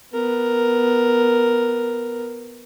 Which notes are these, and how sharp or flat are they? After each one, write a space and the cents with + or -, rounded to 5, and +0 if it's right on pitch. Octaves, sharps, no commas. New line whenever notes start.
B3 +0 A#4 +0